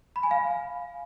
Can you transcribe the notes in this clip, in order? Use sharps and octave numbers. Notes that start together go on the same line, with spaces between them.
B5
G#5
F5